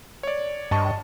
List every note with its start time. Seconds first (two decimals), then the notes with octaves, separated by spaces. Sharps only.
0.23 C#5 D5
0.71 G2 D#5 A5 C#6